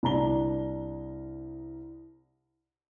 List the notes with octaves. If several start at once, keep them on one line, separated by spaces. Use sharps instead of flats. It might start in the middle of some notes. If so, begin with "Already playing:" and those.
C2 D4 A#5 G7